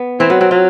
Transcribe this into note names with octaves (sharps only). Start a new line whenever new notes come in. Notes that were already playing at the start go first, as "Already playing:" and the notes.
Already playing: B3
E3 C4
F#3 B3
F#3 C4
F#3 F4